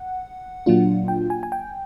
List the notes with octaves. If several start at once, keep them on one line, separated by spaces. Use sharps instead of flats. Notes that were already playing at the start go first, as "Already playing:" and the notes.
Already playing: F#5
A#2 F#3 A#3 D4 F4
G5
G#5
G#5
G5